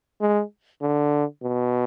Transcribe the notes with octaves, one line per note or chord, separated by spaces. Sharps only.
G#3
D3
B2